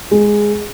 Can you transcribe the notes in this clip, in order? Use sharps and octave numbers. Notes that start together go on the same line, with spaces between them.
G#3